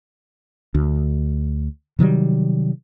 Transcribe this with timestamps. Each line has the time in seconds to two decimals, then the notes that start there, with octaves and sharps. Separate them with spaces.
0.75 D2
1.99 C3 D#3 F#3 G3